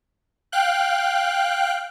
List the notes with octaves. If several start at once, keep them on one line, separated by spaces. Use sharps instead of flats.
F5 G5 F#6